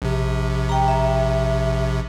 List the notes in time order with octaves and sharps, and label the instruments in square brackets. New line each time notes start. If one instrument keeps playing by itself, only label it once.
[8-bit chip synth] A#1 C3
[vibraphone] G5 A#5
E5